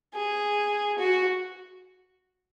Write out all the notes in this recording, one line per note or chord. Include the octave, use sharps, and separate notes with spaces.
G#4
F#4